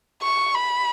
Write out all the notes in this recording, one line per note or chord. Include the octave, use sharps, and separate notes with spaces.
C#6
B5